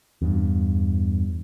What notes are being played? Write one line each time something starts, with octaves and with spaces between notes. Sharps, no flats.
E2 G2